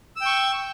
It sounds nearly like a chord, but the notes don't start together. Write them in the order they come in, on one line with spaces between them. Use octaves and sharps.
E6 G5 C#6